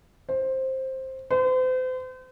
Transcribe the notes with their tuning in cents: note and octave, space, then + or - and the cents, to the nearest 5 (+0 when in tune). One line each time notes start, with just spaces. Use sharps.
C5 +10
C5 -40